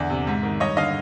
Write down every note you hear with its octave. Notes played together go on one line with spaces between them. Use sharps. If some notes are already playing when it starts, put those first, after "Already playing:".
Already playing: E2 D3 D5 E5
C3
G#2
D#3
G2 C#5 D#5
D3 D#5 F5